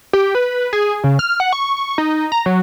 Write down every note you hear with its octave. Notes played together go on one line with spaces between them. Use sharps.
G4
B4
G#4
C#3
F6
F#5
C#6
C#6
D#4
A#5
F#3